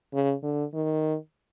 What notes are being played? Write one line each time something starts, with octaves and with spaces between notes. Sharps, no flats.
C#3
D3
D#3